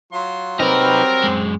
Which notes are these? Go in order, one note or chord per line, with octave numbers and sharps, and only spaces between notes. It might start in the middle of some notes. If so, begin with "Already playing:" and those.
F#3 F4 C6
F#3 G3 C4 D#4 G4 A#4 B4
F#2 G#3